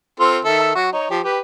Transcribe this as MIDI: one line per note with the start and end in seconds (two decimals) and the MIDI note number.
0.20 0.39 60
0.20 0.39 65
0.20 0.39 69
0.45 0.73 51
0.45 0.73 69
0.45 0.73 76
0.75 0.91 54
0.75 0.91 66
0.93 1.08 63
0.93 1.08 73
1.10 1.20 53
1.10 1.20 67
1.24 1.39 67
1.24 1.39 71